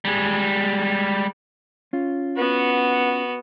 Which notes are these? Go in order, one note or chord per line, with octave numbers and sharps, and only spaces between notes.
G3 G#3
C#4 F4
B3 F#4